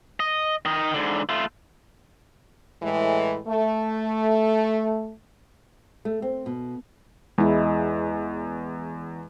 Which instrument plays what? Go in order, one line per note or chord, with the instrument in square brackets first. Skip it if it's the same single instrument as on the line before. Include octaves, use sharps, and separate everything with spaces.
[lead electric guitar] D#5
D#3 D#5
G#2 D3
A3 F4
[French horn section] A2 E3 G#3
A3
[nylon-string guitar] A3
C4
B2
[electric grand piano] E2 [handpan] G#3 E4